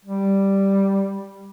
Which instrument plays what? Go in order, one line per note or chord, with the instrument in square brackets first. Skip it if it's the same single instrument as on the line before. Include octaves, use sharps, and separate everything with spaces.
[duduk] G3